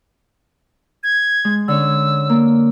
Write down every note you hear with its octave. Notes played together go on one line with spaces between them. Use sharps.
G#6
G#3
D3 C#4 E6
A#3